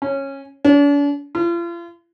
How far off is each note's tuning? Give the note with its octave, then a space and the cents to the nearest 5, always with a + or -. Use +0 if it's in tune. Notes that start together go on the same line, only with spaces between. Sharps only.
C#4 -15
D4 -45
F4 -40